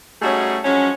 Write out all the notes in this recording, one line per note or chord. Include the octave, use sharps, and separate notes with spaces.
G3 A3 C#4 D#4 F#4 G#4
F3 F#3 G#3 C#4